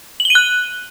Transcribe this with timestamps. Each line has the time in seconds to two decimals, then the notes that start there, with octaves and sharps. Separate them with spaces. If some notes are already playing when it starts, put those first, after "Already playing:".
0.20 F#7
0.25 G7
0.30 D#7
0.35 F#6